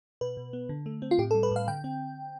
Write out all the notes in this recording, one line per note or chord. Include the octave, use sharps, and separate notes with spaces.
B2 B4
B2
B3
D3
A3
C4
F4
A2 G4
A4
G3
B4
A2 F5
D3 G5
C4